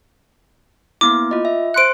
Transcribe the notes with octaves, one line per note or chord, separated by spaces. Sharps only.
A#3 B3 E4 D6
F4 D#5
E5
C5 C6 F#6 C#7 D7